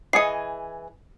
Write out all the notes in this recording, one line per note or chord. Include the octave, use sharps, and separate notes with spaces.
E3 G#4 D#5 C7 C#7